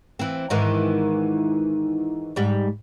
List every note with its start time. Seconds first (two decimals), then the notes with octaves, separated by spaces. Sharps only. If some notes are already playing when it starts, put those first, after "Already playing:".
0.19 E3 C4
0.50 G#2 D#3 E3
2.36 G#2 G3